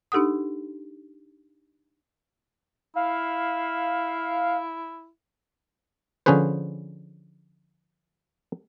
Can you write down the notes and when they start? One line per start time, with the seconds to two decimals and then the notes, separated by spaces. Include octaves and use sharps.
0.12 D4 D#4 G4 A4 F#5 D#6
2.96 E4 F5
6.26 D3 F3 C#4 G#4 B4 C5